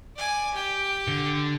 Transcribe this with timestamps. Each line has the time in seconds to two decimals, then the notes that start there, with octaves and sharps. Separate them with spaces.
0.16 D5 G#5
0.54 G4 G5
1.08 D3